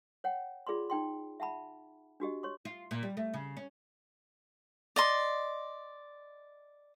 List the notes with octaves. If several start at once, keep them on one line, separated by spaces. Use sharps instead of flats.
C#5 F#5 G5
F4 G#4 D5 B5 C6
D#4 G5 C6
E5 F#5 A5 B5
D4 F#4 G4 D#5
C#5 C6 C#6
F4
A#2
G3
A3
C#3
C#4
D5 D#5 C6